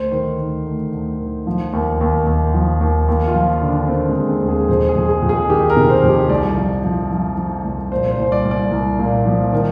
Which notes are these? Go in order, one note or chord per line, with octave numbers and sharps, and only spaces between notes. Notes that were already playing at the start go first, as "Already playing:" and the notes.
Already playing: D2 C5
D#3
D2
D2
D2
D#3
F3
D#2
D#2
D#2
F3
D#2
D#2
F4
F3
D3
D4
D#2 C4
G#3
D#2
C4
D#2
G#4
F2 C5
G#4
F2
G#4
F2
G#4
D#3 G4
A#4
C3
C5
F2
G4
C2 D5
F3
F3
F3
F3
C2
A#2 C5
C5
C2
D5
C2
D5
C2
A#2
F3
D#3